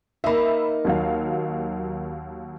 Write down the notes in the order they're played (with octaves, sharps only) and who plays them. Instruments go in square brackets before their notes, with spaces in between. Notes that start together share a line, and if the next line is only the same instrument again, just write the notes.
[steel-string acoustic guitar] A#3 D#4 [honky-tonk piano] E5 B5
[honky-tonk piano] D#2 F#3 F5